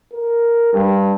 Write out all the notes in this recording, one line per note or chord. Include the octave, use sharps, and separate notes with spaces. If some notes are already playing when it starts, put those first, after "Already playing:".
A#4
G2